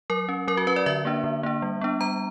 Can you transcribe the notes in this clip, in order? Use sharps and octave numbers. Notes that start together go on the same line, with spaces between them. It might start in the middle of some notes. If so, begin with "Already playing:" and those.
F#3 A#4
C#4
F#3 A#4
F#4
C#4 B4
D5
D3 E5
A#3 D4
D3
A#3 D4
G3
B3 D4
G3 A#5